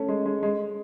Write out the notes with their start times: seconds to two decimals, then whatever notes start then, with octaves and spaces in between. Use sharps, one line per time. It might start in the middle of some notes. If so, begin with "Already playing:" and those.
Already playing: A3 C#4
0.08 G#3
0.26 G#3
0.43 G#3